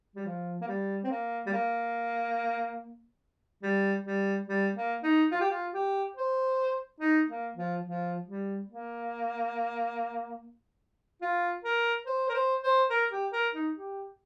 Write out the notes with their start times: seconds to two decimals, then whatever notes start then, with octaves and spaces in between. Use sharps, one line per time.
0.16 G3
0.25 F3
0.61 A#3
0.68 G3
1.04 C4
1.10 A#3
1.46 G3
1.52 A#3
3.63 G3
4.05 G3
4.47 G3
4.75 A#3
5.03 D#4
5.31 F4
5.41 G4
5.50 F4
5.74 G4
6.16 C5
7.00 D#4
7.28 A#3
7.56 F3
7.84 F3
8.27 G3
8.68 A#3
11.22 F4
11.64 A#4
12.06 C5
12.29 A#4
12.34 C5
12.63 C5
12.90 A#4
13.11 G4
13.33 A#4
13.54 D#4
13.74 G4